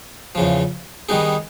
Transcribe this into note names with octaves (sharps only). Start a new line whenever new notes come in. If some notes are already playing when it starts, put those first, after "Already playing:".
E2 C#3 F3
D#3 G3 B3 D#4 G#4